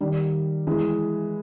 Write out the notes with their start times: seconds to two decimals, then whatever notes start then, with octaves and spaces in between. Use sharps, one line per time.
0.01 D#3 G3
0.67 E3 G#3